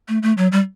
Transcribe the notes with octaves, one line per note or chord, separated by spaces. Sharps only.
A3
A3
F#3
G3